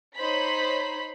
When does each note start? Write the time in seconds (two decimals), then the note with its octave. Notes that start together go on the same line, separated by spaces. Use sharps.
0.17 D#4 C5 C#5 B5 B6